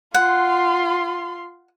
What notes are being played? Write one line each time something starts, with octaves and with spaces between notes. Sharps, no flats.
F4 F#5 C6